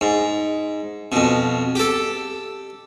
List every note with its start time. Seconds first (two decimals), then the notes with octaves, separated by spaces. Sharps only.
0.01 G#2
1.12 F2 B2
1.75 G4 A4